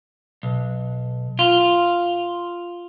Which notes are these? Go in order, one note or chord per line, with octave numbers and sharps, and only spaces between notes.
B1
F4